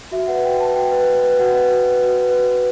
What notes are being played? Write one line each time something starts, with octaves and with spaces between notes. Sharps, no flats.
F#4 E5
B4 F#5
F#4 G5
B4 A5
F#4 G5
B4
F#4
B4
F#4 F#5
B4
F#4
B4
F#4
B4
F#4
B4